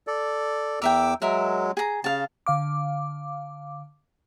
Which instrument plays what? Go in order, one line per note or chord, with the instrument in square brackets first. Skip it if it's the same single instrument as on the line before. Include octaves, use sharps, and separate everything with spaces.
[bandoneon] A4 D5
[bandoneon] E2 D6 E6 [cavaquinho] A#4 E5 G5
[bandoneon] F#3 G#3 [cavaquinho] A#4 E5
[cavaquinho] G#4 A#5
[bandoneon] C#3 [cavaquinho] F5 A5
[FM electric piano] D3 F5 D6